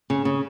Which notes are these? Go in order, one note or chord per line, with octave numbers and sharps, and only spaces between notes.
C#3
C#3